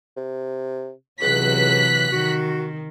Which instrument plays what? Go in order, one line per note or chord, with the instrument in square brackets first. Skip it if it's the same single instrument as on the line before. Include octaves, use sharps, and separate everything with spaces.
[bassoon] C3
[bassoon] C#2 [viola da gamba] C3 E3 F#3 [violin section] F#6 B6
[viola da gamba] D#3 [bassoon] F#4